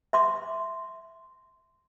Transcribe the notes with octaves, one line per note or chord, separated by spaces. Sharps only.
E5 C6 D6